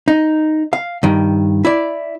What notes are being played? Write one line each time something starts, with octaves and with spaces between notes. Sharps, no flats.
D#4
F5
G2 D#3
E4 D5